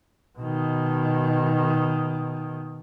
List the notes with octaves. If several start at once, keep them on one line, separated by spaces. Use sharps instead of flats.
B2 D#3